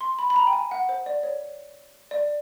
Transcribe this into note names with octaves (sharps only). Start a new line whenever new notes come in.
C6
B5
B5
A#5
G5
G#5
F#5
C5
D5
C#5
D5